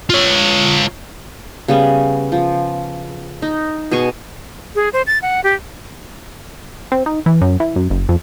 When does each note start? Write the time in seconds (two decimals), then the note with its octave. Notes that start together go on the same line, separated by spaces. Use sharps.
0.10 F4 C#5
1.68 C#3 G3 B3 C#4
2.32 F3
3.42 D#4
3.91 B2 G#4 G#5 C#6
4.75 G#4
4.93 C5
5.07 A6
5.22 F#5
5.44 G4
6.92 C4
7.06 D#4
7.26 E3
7.42 F#2
7.60 E3
7.76 F#2
7.90 F#1
8.09 F2